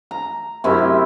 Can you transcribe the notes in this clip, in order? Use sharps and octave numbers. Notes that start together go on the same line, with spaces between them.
A#5
F#2 C3 E4